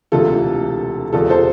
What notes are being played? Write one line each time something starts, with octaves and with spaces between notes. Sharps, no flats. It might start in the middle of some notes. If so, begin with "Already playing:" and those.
E1 D2 C3 E3 F4 A4
E1 E2 C3 F4 A4
A4 C5